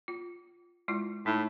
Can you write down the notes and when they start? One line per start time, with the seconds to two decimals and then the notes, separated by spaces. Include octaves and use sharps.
0.08 F4
0.88 G#3 E4 F4
1.26 A2 D#4